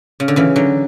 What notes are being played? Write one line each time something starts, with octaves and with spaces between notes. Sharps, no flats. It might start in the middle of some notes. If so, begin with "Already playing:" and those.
C#3
D3
C#3 E3
D3 F#3